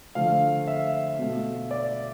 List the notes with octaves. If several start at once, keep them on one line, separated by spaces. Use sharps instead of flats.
D3 F3 A3 F5
E5
B2 A3
D5